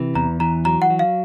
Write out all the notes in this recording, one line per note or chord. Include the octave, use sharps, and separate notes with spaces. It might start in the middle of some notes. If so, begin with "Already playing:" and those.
Already playing: C3 E3
E2 A#5
E3 A#5
F#3 A#5
F#5
F#3
F5